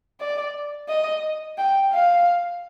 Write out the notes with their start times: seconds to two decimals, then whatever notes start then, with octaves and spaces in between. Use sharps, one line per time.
0.20 D5
0.89 D#5
1.58 G5
1.93 F5